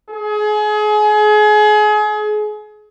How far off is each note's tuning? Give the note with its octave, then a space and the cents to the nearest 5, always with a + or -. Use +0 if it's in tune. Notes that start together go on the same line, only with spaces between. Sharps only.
G#4 +30